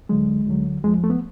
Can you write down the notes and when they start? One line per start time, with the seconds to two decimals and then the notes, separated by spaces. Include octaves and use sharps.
0.09 D2 D3 F#3 G#3
0.47 D2 D3 F#3
0.84 F2 F3 G#3
1.04 A3
1.10 B3